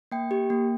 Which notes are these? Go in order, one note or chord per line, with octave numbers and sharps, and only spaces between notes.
A#3 G5
G4
A#3